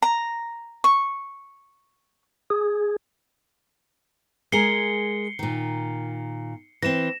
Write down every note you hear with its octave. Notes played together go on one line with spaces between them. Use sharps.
A#5
C#6
G#4
G#3 G#4 A#4 C7 C#7 G7
A#2 D#3
E3 C4 A#6 E7